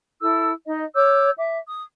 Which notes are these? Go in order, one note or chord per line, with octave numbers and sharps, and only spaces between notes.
E4 A4 E6
D#4 D#5
C#5 D6 E6 G6
E5 D6
D#6